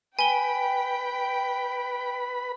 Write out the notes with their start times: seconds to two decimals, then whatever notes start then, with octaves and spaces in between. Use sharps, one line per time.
0.19 B4 G5 G#5 B5 G7